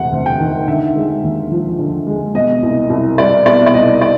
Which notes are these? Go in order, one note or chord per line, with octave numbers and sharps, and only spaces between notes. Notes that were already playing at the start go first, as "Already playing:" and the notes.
Already playing: E1 D2 C3 F#5
D2
G5
D#3
D3 E5
G#3
D#2
F3
D3
G#3
B2 D#5
C2
C2
G3 D5
B2 D5
D5
C2 D#5
D5